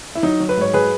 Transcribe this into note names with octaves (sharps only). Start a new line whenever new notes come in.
E4
F#3 D#4
F#3
B4
G#2 C#5
F#3 G#4 B4